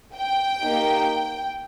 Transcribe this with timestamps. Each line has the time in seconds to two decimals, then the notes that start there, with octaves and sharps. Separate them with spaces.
0.16 G5
0.61 A#3 D#4 G4